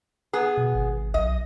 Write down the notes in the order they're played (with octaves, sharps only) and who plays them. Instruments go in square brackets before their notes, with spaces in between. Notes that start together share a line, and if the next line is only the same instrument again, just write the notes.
[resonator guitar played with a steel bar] B3 G#4
[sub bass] B2
G#1
[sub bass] B1 [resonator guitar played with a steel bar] D#5